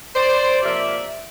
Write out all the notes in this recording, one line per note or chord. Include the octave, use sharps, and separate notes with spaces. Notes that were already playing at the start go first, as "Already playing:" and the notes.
C5 D5
C3 F3 A#3 D5 E5